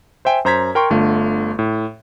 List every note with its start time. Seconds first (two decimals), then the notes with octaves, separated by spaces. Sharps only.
0.25 C5 E5 G5 G#5
0.45 F#2 C5 A#5 G#6 B6
0.75 A#4 G5 C6 C#6
0.90 G1 D3 A3 F4
1.59 A2